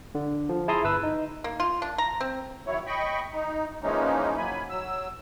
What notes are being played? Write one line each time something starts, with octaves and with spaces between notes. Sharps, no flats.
D3
F3
E4 G#4 A5 A#5 C6 D#6
G1 B4 E6
D#4
A#3
F4
D4
A#5
C4
D#3 F#3 E4 C#5
D#5 G5 B5 C#6
D#4
E3 F3 G#3 A#3 C#4 D#4
F#3 A#3 G#5 B5
F#3 E6